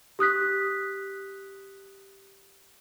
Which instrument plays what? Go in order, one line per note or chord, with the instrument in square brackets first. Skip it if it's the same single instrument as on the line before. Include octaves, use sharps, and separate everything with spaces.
[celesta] G4 D#6 F#6 B6